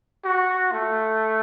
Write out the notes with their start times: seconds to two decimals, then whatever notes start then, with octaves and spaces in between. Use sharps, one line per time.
0.24 F#4
0.72 A3